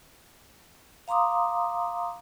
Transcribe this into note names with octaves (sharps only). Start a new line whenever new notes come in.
F5 A#5 C6 D6 D#6